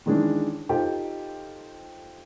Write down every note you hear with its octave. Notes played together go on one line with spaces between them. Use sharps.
D#3 E3 G#3 C#4 D4
D#4 F4 G4 A4 C5 G5